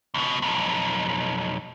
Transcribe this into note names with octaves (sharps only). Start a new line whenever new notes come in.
C#2 B2
B1 F2